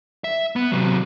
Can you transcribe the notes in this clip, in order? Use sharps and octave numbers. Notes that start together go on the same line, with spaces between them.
E5
B3
C3 F#3